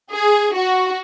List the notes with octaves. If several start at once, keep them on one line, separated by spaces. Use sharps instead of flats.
G#4
F#4